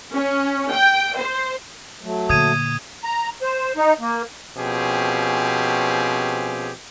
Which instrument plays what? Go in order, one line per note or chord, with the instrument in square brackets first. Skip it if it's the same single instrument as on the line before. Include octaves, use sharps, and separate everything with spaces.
[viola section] C#4
G5
C5
[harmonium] F#3 A3
[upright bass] A#2 D3 [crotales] D#6 G#6 D#7
[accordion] A#5
C5
D#4
A#3
[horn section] B2 F3 C4 C#4 G4 G#4